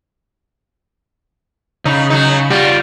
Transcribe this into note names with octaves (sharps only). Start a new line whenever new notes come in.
C#3 D#4
F#3 D#4
G3 F4 F#4